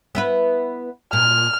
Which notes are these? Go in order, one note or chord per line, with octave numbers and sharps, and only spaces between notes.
B3 E4 B4
A#2 F6